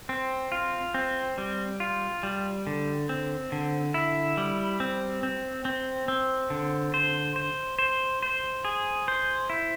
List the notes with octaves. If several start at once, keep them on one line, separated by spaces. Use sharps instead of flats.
C4
F4
C4
G3
F4
G3
D3
C4
D3
E4
G3
C4
C4
C4
C4
D3
C5
C5
C5
C5
G#4
C5
E4